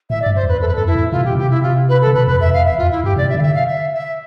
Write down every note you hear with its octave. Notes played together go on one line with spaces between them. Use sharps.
A2 E5
D5
G2
C5
E2 B4
E2 A4
B4
F2 A4
E4
A2
C3 F4
B2 G4
C3 G4
E4
F4
B4
A4
C3
B2 B4
F2 B4
E2 E5
F2 F5
E2 E5
E2 F4
E4
G2 G4
C3 D5
E5
D3 F5
E5
F5
E5
E5